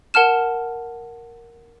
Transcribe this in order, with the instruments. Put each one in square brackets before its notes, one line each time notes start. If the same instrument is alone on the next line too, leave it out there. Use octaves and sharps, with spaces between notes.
[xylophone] A#4 F#5 A5 F6 E7